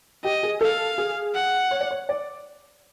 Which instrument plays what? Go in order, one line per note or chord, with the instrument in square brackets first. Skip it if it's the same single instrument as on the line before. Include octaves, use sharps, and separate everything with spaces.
[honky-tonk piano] G4 [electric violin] D#5
[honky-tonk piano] G#4
[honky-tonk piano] A4 [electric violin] F5
[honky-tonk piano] G#4
[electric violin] F#5
[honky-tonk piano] C#5
D5
C#5
D5